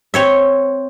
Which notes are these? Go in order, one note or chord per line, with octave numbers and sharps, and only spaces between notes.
C4 C#5 E5